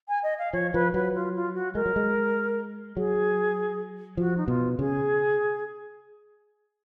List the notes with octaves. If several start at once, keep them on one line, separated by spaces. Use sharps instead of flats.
G#5
D#5
F5
F3 C#5
F3 B4
F#3 B4
F4
F4
F#4
G#3 A#4
F#3
G#3
F#3 G#4
F3 F#4
D#4
B2 F4
C#3 G#4